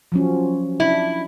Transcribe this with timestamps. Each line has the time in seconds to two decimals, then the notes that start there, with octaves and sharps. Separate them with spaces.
0.12 F3 F#3 C#4
0.80 D4 E4